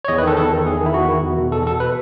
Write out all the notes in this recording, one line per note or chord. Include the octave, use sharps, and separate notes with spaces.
C#5
E2 D#5
B4
D#3 A4
E2 A4
D#3
E2 G#4
D#3
E4
E2 F#4
D#3
E2
B2
E2 A4
B2 A4
B4